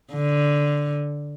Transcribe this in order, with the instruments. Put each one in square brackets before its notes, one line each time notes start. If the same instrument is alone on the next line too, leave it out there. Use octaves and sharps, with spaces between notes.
[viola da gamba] D3